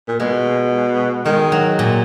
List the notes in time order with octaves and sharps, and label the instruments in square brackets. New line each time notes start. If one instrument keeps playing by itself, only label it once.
[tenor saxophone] A#2
[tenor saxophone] B2 [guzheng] G#3
[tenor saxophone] D#3 [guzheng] G#3
[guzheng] F#3
A#2